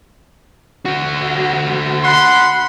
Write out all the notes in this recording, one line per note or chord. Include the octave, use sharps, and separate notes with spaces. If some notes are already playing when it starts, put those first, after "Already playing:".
D3 F#4
F#5 B5 C6